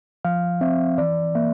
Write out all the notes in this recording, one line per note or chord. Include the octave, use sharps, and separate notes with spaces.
F3 F5
C4 E5
E3 D5
A#3 E5